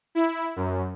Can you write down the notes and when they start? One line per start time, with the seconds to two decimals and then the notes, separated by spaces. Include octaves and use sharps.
0.15 E4
0.56 F#2